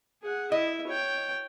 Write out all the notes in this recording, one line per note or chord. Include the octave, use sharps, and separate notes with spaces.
G#4 F#5
E4 D#5 E5
C#5 G5